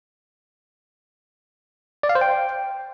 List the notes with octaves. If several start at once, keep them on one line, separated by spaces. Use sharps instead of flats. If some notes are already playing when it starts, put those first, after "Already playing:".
D5
F5
C5
G5